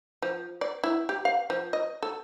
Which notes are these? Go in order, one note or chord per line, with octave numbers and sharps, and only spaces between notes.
F3
D5
E4
G4
F5
F3
D#5
A4